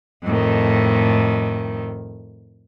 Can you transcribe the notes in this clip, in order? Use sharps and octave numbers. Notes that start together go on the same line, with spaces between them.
F2 A2 D#3